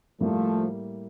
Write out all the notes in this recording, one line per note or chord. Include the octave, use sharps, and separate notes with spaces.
A2 F3 G3 A3 A#3